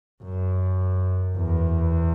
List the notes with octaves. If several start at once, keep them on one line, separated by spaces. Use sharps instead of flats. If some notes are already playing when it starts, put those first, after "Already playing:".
F#2
E2